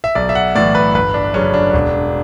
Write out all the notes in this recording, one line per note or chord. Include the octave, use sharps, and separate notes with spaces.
E5
B1 D5
E5
F#5
A2 E3 D5
B4
G1 B4
D4
F#2 C#3 C#4
D4
E1